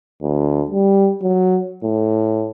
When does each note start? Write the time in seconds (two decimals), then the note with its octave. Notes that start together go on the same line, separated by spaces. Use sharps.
0.22 D2
0.70 G3
1.22 F#3
1.83 A2